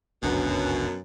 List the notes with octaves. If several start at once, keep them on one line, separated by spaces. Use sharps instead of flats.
G1 C#2 F#2 B2 D4